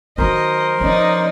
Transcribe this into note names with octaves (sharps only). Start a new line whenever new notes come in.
D#3 F#3 A#4 C5 D#5
F3 C#4 D#4 D5 D#5